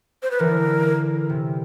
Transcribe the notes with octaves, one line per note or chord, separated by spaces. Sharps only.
C5
B4
D3 E3 A#4
C3